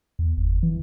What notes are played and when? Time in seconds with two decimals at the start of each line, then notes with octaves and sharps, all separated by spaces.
0.19 E2
0.37 F#1
0.63 E3